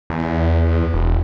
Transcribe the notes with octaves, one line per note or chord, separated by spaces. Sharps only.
E2
E1